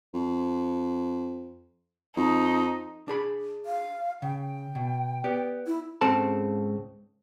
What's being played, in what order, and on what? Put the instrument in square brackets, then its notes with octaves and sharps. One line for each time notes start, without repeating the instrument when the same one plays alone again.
[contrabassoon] F2
[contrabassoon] F2 [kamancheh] D#4
[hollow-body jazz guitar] D4 G#4 B5
[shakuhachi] F5
[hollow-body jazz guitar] C#3 [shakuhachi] G5
[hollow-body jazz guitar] B2
B3 G4 D5
[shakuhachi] E4
[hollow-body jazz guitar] C#2 G#2 C#3 C4 A4 A5